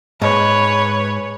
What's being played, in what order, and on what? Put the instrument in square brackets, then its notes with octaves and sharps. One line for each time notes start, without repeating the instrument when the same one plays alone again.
[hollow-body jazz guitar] G#2 [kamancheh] B4 C#5